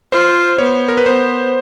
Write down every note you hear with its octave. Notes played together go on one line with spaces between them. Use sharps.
F4 C5
B3 C#5
A#4
B4
B3 C5